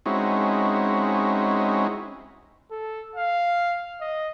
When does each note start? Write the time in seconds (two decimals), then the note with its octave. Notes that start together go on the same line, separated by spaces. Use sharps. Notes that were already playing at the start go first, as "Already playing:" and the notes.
0.06 G#3 C4 C#4 D#4 E4 F#4
2.72 A4
3.16 F5
4.01 D#5